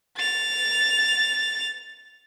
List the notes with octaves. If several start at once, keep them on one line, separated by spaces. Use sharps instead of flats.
A6 F7